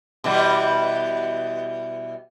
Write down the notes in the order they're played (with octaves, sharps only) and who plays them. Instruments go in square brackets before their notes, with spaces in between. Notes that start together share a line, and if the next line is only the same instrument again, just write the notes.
[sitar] B2 E3 G3